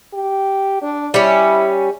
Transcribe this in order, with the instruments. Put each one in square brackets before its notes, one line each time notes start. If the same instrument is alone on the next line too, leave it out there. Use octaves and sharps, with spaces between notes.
[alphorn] G4
D4
[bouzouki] G3 C#4 [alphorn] E4